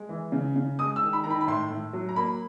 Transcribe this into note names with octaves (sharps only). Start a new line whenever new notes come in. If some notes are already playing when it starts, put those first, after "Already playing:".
Already playing: G#3
E3
C#3
C#3
G#3 D#6
E6
D#3
B5
D#3 A#5
B5
B5
A2 C6
A2
F#3
A#5
A#3 B5